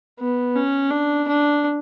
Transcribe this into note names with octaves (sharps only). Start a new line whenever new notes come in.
B3
C#4
D4
D4